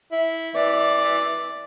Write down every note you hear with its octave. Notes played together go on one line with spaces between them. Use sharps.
E4
E3 D5